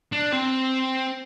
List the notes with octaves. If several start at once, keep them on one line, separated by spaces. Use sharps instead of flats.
D4
C4